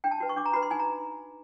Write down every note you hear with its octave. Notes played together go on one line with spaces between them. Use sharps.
D4 G5
A5
F#4 B4
C#6
D4 D6
A#5
F#4 B4 B5
C6
D#4 G#5
A#5